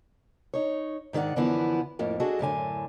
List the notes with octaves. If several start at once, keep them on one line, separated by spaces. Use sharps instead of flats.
D#4 C#5
G#2 D#3 F4 D5 F#5
F#2 D3 E3 F3 B3 E4
F2 A2 A#3
D4 F#4 G#4 A4 D#5
F#2 A2 D3 G#5